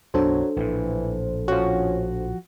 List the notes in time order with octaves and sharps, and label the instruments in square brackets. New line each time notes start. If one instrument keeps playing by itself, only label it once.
[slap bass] B1 F#2 [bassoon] F#3 [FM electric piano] D4 A4 C5
[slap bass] A#1 A2 [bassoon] E3
[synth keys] F3 F#4 [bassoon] C#4